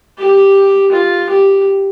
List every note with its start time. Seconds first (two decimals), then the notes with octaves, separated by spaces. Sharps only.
0.18 G4
0.92 F4
1.30 G4